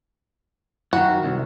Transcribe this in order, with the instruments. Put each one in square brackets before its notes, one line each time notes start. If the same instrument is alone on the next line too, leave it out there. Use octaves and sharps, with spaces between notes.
[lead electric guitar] F#2 D#3 [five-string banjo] F#4
[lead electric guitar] C2